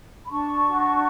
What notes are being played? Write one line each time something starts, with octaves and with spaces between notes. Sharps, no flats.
B5
D4 A5 C#6
F#4